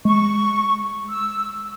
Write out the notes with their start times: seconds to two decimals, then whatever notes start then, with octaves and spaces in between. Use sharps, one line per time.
0.05 G#3 C#6
1.09 E6